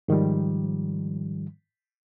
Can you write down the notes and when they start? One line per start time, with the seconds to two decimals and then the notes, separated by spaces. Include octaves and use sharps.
0.08 G#2 D#3 F3 G3